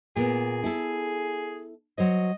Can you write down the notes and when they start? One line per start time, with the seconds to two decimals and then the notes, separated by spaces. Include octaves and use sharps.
0.16 A#2 A#3 B3 G#4
0.64 E4 A4
1.98 F#3 C5 C#5 D#5